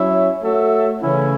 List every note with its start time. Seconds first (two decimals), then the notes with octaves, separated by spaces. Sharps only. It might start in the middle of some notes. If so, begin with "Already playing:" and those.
Already playing: F#3 C#4 E4 C#5 E5
0.42 A3 F#4 A4 C#5 E5
1.00 C#3 E3 A3 C#4 E4